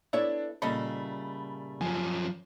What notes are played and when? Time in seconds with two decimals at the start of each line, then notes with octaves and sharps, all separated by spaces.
0.13 B3 D4 E4 A4 C#5 D5 E5
0.62 A#2 C#3 G3 A3 A4 D#5 B5
1.81 F#2 F3 G#5